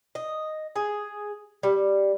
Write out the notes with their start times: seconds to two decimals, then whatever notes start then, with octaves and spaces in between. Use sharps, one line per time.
0.15 D#5
0.76 G#4
1.63 G3